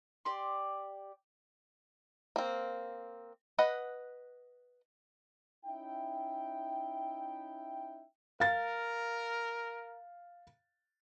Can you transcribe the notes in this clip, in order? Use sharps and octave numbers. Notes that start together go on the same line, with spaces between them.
G4 D5 C6
A#3 C4
B4 D#5 F#5
C#4 D#4 E4 E5 G5
A#4 F5 A6